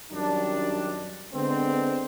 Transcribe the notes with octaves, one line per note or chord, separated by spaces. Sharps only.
F#2 D#3 G3 D4
D3 G#3 B3 C4